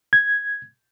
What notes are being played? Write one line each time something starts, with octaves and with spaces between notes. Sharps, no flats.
G#6